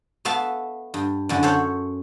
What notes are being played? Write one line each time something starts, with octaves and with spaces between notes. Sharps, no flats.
A3 B3 E5 F5 A5
G2
F#2 D3 E4
A4 C5 C#5 F#5